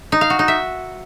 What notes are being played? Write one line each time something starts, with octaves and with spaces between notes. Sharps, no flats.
D#4
F5
F#4
D#4
E5